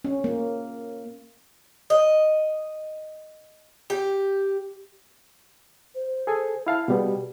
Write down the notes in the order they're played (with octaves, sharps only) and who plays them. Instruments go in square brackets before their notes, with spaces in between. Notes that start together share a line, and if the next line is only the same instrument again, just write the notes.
[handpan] C#4
A#3
[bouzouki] D#5
G4
[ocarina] C5
[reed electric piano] G#4 A4 G#5
E4 F5 A5
[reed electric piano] B2 G3 B3 [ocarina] G#4
[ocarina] G4